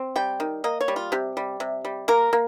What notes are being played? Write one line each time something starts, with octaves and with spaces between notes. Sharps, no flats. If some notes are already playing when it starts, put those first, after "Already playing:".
Already playing: C4
G3 G5
D#3
A#3 D#5
C#5
G3
F4
C3 G4
G3
C3
G3
A#3 A#4
A#3